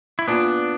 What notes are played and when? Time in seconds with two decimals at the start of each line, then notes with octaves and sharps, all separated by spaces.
0.19 E4
0.28 A#2 B3 D4